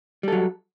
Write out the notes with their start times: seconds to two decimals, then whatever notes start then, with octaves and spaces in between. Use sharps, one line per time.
0.23 G3
0.28 A4
0.32 F#3